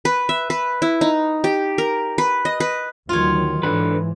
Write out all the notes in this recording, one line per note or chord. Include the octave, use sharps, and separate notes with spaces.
B4
E5
B4
E4
D#4
G4
A#4
B4
D#5
B4
D2 D#3 F#3 F4 C#5
G#2 D3 E3 B4